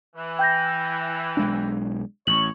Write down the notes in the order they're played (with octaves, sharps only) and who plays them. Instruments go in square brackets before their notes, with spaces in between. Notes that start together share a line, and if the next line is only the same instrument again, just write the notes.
[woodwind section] E3
[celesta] G5 G6 A#6
[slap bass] B1 G#3 D4
[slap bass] A1 [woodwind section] C#5 [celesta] F#7